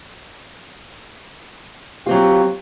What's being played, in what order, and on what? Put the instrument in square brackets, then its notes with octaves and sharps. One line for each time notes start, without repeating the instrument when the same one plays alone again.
[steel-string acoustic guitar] F#3 C4 F4 [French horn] G4